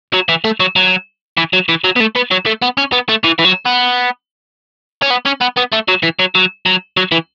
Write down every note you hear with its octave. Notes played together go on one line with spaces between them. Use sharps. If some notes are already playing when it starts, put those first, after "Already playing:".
F#3
E3
A3
F#3
F#3
E3
F#3
E3
F#3
B3
A3
B3
F#3
A3
B3
C#4
B3
A3
E3
E3
F#3
B3
C#4
B3
C#4
B3
B3
A3
F#3
E3
F#3
F#3
F#3
F#3
E3